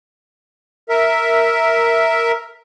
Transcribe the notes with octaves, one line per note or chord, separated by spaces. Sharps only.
A#4 E5